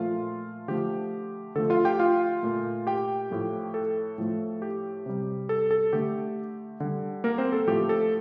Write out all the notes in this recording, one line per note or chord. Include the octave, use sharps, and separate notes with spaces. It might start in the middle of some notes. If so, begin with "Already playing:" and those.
Already playing: A#2 F3 A3 F4 F5
D3 F3 A3 G4
D3 F3 A3 A4
F4 F5
G4 G5
F4 F5
A#2 A3
G4 G5
A2 F3 A3
A4
A2 F3 A3
G4
C3 G3
A4
A4
D3 A3 G4
D3 G3
A#3 A#4
C4 C5
A4
A2 F3 A3 G4
A4